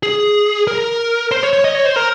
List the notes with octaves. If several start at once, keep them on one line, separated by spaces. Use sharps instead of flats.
G#4
A#4
C5
C#5
C#5
D#5
C#5
C5
A#4